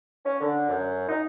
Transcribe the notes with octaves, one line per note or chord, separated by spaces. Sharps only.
C#4
D3
F#2
D#4